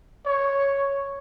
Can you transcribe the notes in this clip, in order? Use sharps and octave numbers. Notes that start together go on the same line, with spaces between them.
C#5